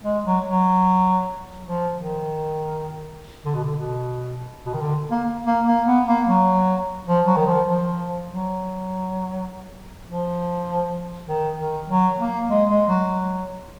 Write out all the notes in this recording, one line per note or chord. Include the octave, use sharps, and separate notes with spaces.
G#3
F#3
F#3
F3
D#3
D3
B2
D3
B2
B2
D#3
D3
A#3
A#3
A#3
B3
A#3
F#3
F3
F#3
D#3
F3
F3
F#3
F3
D#3
D#3
F#3
A#3
G#3
G#3
F#3